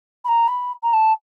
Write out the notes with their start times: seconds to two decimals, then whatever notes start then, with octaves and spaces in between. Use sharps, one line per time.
0.25 B5
0.28 A#5
0.48 B5
0.83 A#5
0.93 A5